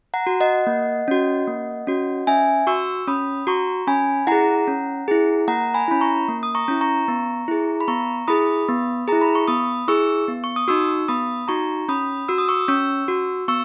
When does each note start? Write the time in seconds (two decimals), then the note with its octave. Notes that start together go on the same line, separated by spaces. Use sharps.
0.14 F#5 A#5
0.27 F#4
0.41 D#5 F#5
0.67 A#3
1.08 C#4 F#4
1.47 A#3
1.87 C#4 F#4
2.27 C#4 E5 G#5
2.67 F#4 C#6 E6
3.07 C#4 B5 D#6
3.47 F#4 A#5 C#6
3.87 C#4 G#5 B5
4.27 E4 G#4 F#5 A#5
4.67 C#4
5.08 E4 G#4
5.48 A#3 F#5 A#5
5.74 G#5 B5
5.88 C#4 E4 B5
6.01 A#5 C#6
6.28 A#3
6.43 D#6
6.55 A#5 C#6
6.68 C#4 E4
6.81 A#5 C#6
7.08 B3
7.48 E4 G#4
7.80 B5
7.88 B3 A#5 C#6
8.28 E4 G#4 B5 D#6
8.69 B3
9.08 E4 G#4 A#5
9.21 B5
9.35 C#6
9.48 B3 B5 D#6
9.88 E4 G#4 C#6 E6
10.28 B3
10.44 C#6
10.56 D#6
10.68 D#4 F#4 C#6 E6
11.08 B3 B5 D#6
11.48 D#4 F#4 A#5 C#6
11.88 C#4 B5 D#6
12.28 F#4 E6
12.38 D#6
12.48 C#6 E6
12.68 C#4 C#6 E6
13.08 F#4
13.48 B3 C#6 E6